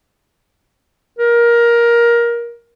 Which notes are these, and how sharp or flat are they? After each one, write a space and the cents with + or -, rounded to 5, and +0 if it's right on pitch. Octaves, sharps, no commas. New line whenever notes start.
A#4 +15